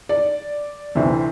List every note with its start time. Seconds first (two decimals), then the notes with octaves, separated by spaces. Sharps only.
0.09 D5
0.95 D2 C3 E3